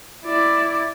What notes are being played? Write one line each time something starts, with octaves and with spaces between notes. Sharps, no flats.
E4 D5